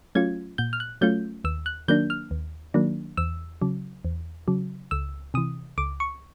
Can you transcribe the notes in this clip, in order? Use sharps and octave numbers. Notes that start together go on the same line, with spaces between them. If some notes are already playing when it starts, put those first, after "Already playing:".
F#3 A3 C#4 F4 G#6
A#2 G6
F6
F#6
F#3 A3 C#4 F4 G6
D#2 E6
F#6
D#3 F#3 A#3 D4 G6
F6
D#2
D#3 F#3 A#3 D4
E2 E6
C#3 F#3
E2
C#3 F#3
C#2 E6
C3 E3 D#6
C#2 D6
C#6